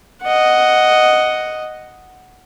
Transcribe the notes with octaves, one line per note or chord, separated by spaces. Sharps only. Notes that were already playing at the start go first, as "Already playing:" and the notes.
D#5 F#5